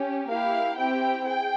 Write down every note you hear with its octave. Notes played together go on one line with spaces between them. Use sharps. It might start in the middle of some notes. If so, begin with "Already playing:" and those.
Already playing: C#4 G4
A#3 E4 G4 F5
C4 E4 G4 G5
G#4 G5